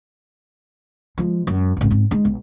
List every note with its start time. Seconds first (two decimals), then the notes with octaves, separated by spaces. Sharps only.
1.18 F3 G#3
1.47 F#2
1.77 G#1 C#2
1.91 G#2 C4
2.11 G#3 D#4
2.25 B1